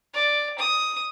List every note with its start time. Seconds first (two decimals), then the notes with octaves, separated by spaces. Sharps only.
0.14 D5
0.59 D#6